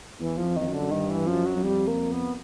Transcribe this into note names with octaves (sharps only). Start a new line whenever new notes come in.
E2 E3
F3
F2
F2 D#3
F#2
D3
F#2
G2 D#3
E3
F#2 F3
F#3
F#2
F2 G3
A#3
B3